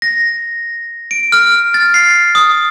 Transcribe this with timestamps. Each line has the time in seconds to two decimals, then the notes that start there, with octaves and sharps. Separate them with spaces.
0.02 A#6
1.11 D7
1.32 F6
1.74 A6
1.94 C7
2.35 D#6